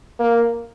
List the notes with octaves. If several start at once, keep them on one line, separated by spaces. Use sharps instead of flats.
A#3